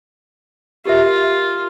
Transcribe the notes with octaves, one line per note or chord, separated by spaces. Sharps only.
F4 G4 A#4 E5